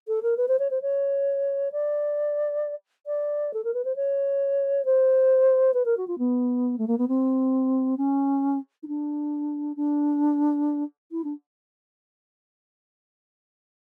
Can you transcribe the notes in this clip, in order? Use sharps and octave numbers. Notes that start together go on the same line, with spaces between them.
A4
A#4
B4
C5
C#5
C5
C#5
D5
D5
A4
A#4
B4
C5
C#5
C5
B4
A#4
F#4
F4
B3
A3
A#3
B3
C4
C#4
D#4
D4
D4
E4
D4